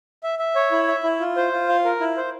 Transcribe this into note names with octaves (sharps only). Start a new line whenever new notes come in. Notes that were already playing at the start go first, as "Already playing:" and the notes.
E5
E5
C#5
E4
E5
E4
F4
C5
F4
F5
A#4
E4
C5